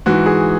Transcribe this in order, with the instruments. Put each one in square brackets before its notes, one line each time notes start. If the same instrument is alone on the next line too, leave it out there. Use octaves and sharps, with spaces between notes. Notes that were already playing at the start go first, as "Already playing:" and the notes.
[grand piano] G#2 E3 F#4
G#4